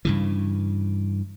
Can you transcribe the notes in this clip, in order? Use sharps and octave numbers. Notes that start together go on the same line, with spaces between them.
G2 C#3 E3